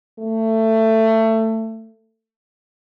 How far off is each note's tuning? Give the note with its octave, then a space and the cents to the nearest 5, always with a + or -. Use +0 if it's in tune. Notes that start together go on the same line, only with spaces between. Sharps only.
A3 +20